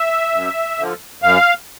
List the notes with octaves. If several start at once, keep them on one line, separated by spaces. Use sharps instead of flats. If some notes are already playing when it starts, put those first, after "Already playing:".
Already playing: E5
F#2
D3 F3
F#2 F5